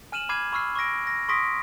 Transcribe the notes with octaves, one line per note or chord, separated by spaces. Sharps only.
G#5 F6 D#7 E7 F#7
B5 D6 F6 G#6 C7 D#7
B5 C#6 E6 F6 C7
C#6 D6 E6 A#6 D7
A#6
C6 C#6 D#6 A#6 B6 D7